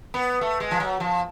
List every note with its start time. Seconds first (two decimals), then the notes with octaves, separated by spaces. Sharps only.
0.14 B3
0.41 A3
0.60 G#3
0.71 F3
0.80 F#3
1.00 F3